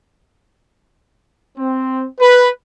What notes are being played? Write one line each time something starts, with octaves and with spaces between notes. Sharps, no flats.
C4
B4